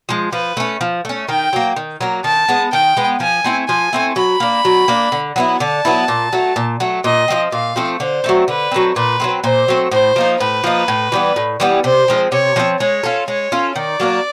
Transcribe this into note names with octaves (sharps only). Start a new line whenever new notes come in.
F3 G#3
F3 B4
A3 C#4
F3
A3 C#4
D#3 G5
F#3 A#3
D#3
F#3 A#3
D#3 A5
G#3 B3
D#3 G5
G#3 B3
F3 G#5
A3 C4 E4
F3 G#5
A3 C4 E4
F#3 B5
A#3 D4
F#3
A#3 D4
D3
F#3 B3 E4
D3 A5
F#3 B3 E4
A#2
F#3 A3
A#2
F#3 A3
A#2 D#5
F3 A3 C4
A#2 F5
F3 A3 C4
D3 C5
F#3 A3 C4
D3 B4
F#3 A3 C4
A#2 B4
F#3 A3 C4
A#2 C5
F#3 A3 C4
A2 C5
F3 A#3 D#4
A2 B4
F3 A#3 D#4
A2
E3 G3 B3
A2
E3 G3 B3
C3 C5
F3 G#3 C4
C3 C#5
F3 G#3 C4
G#3 C#5
C#4 F4 A4
G#3 C#5
C#4 F4 A4
D#3 D5
F#3 A#3 D4